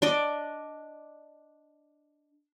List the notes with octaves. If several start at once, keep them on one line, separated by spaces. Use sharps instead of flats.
D4 D5 D#5